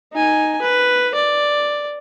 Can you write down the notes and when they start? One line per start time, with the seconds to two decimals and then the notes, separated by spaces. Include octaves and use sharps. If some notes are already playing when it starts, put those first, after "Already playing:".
0.12 D#4 G#5
0.61 B4
1.15 D5